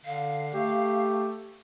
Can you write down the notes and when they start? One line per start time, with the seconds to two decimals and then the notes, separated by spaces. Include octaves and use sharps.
0.05 D3 F5
0.54 A3 G4